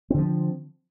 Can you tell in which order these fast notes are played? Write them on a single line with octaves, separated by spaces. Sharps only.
C4 D3 F3